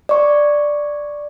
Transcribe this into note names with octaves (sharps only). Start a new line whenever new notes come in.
D5 C#6